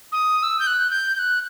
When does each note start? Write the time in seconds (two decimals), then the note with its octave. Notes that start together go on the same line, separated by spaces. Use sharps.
0.12 D#6
0.43 E6
0.59 G6
0.67 F#6
0.90 G6
1.14 G6
1.19 F#6